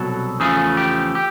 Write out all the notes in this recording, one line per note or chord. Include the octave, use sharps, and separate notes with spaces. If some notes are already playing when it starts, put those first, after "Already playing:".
Already playing: C2 B2 F#3 A4
E2 C#3 F3 A3 G#4
G4
G4